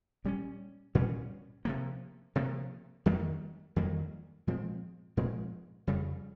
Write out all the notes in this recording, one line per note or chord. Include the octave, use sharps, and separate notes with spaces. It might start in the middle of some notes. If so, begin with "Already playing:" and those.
A#2 G3 A#3 C#4
A#2 G3 A#3 C#4
C3 F3 A#3
C3 F3 A#3
F2 D#3 G3 A#3
F2 D#3 G3 A#3
A#2 F3 G#3 C4
A#2 F3 G#3 C4
F2 C#3 G3